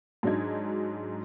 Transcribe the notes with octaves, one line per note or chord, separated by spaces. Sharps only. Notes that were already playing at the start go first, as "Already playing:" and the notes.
G#2 F#3 D4 D#4 G#6